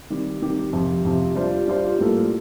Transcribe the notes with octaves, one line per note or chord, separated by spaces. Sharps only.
D#3 G3 C4 G4
D#3 G3 C4 G4
F2 C3 F3
F2 C3 F3
G3 D4 F4 C5
G3 D4 F4 C5
A2 G3 A#3 F4 A4